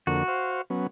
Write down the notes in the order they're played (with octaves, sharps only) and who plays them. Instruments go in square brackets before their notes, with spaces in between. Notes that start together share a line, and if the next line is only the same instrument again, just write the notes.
[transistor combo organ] F2 D3 A#3 [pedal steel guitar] F#4
[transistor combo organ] C5 F5
F#3 B3 C#4